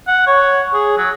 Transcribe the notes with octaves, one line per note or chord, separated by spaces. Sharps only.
F#5
C#5
G#4
F#3